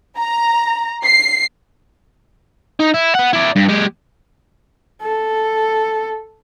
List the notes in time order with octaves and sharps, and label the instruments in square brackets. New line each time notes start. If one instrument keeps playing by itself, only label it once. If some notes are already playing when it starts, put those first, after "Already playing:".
[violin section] A#5
C7
[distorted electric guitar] D#4
E4
B3 F#5
E4 D5
G2
G#3 G4
[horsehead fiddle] A4